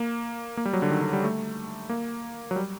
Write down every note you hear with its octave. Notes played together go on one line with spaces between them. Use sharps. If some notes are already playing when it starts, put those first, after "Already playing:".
Already playing: A#3
A#3
G3
F#3
D3
D#3
D3
G3
A3
A#3
F#3
G3